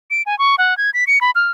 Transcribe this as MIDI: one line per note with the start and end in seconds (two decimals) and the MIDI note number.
0.11 0.22 98
0.26 0.38 80
0.39 0.56 85
0.58 0.77 78
0.78 0.90 92
0.94 1.04 95
1.07 1.19 97
1.21 1.31 83
1.35 1.52 89